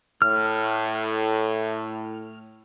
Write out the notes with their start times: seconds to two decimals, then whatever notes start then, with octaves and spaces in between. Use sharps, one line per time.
0.22 A2 F6